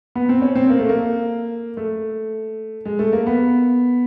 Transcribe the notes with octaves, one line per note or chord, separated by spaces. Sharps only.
B3
C4
C#4
C4
A#3
A3
A#3
A3
G#3
A3
A#3
B3